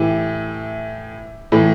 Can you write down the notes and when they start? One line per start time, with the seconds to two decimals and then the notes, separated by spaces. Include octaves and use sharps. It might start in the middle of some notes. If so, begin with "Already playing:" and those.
Already playing: A2 E3 E4 G4
1.52 A2 E3